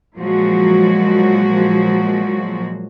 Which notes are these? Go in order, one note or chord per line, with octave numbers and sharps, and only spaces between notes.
A#2 F3 F#3 G#3 F#4